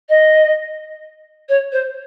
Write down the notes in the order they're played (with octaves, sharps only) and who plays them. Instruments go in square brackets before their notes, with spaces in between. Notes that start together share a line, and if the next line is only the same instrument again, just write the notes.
[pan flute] D#5
C#5
C5